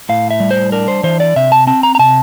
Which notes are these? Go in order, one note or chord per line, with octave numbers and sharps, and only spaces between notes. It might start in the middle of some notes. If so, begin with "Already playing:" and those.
A2 F5
E5
G3
C5
D4 A#4
C5
E3 C5
D5
C3 E5
A5
C4 A5
A#5
A#5
C3 A5